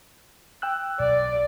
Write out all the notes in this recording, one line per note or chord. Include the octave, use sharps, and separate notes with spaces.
G5 E6 F#6
B1 D5